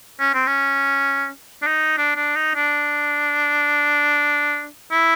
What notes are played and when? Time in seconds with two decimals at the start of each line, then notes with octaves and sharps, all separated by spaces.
0.20 C#4
0.34 C4
0.47 C#4
1.62 D4
1.67 D#4
1.97 D4
2.16 D4
2.36 D#4
2.55 D4
4.92 E4